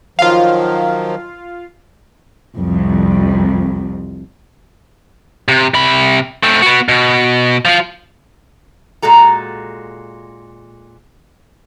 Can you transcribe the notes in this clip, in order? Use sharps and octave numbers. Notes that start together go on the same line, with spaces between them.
D#3 F3 F#3 F4 F5
C2 F2
C3
C3 B5
A3 C4
B3 F#4
B2
F3 F4
A#2 G#3 F#4 A4 A#5